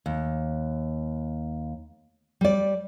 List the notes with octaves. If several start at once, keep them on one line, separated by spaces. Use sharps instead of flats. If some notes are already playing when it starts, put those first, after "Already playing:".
D#2
G3 D5